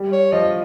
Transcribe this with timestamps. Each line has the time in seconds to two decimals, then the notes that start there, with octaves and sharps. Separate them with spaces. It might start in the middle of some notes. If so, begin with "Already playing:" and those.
Already playing: G3
0.12 C#5
0.32 F3 D#5